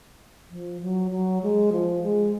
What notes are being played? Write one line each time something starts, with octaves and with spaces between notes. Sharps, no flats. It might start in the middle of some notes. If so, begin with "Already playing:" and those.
F3
F#3
F#3
G#3
F3
G#3